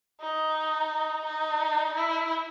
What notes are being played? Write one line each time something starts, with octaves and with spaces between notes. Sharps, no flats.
D#4
D#4
E4